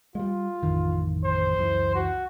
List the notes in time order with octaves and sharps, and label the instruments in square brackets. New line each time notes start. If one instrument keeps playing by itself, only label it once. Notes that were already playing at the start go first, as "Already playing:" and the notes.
[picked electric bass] G3 G#3 [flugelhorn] F4
[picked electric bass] A1 F2 D#3
[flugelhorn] C5
[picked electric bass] C#2 F#2 E3
[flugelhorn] F#4